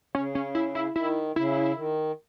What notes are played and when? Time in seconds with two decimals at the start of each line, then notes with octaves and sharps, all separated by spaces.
0.15 C#3 C#4
0.35 C#4
0.55 E4
0.75 E4
0.96 D#3 E4
1.36 C#3 E4
1.76 D#3